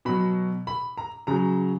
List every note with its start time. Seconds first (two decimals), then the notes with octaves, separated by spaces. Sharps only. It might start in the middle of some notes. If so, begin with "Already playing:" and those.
0.05 B2 F#3 B5
0.67 B5
0.97 A#5
1.27 C#3 F#3 A#5